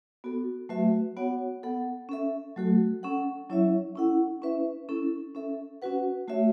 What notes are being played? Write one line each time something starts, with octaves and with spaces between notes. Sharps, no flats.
B3 F#4 A4
F#3 A3 F#4 B4 E5
B3 F#4 C#5 F#5
B3 A4 F#5
C#4 A4 E5
F#3 A3 F#4 A4
C#4 A4 F#5
F#3 C#4 E4 C#5 E5
C#4 E4 A4 F#5
C#4 E4 B4 E5
C#4 E4 A4
C#4 A4 E5
C#4 F#4 B4 F#5
A3 F#4 C#5 E5